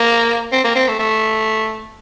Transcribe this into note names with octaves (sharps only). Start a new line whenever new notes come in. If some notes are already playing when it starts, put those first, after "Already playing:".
Already playing: A#3
C4
A#3
C4
A3
A3